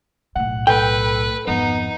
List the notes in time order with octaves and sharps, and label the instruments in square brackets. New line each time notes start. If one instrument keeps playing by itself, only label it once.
[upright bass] B1 A2 [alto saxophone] F#5
[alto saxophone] A4 [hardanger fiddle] B4 [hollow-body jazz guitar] G5
[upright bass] G#1 F2 [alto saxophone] B3 [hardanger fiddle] D#4